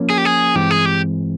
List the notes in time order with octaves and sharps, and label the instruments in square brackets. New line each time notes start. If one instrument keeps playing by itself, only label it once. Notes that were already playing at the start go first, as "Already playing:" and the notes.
Already playing: [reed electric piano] F3 A#3 C#4
[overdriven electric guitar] G#4
G4
G#4
[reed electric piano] G2 E3 G#3 C4 [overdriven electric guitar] G4
[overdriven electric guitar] G#4
G4